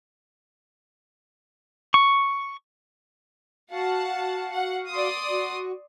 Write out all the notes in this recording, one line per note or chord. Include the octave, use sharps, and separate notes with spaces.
C#6
F#4 F5 F#5 A5
F#5
D5 C6 D#6
F#4